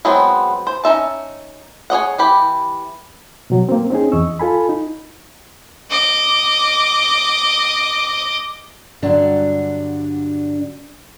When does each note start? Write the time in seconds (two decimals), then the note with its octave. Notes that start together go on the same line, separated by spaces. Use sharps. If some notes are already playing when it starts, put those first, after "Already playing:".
0.05 F#3 G#3 B3 C4
0.67 C5
0.84 C#4 D#4 E5 A5
1.90 G#4 C#5 D#5 F#5
2.18 E3 G4 B5
3.50 B2 F#3
3.69 A#3 C4
3.91 C4 C#4 D#4 G#4
4.12 E2 D#5 C#6 E6
4.39 F4 A4 G#5 B5
4.69 D#4
5.91 D#5 D6
9.02 G2 D3 F#3 D4